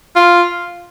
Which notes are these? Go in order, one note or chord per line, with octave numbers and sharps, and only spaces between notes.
F4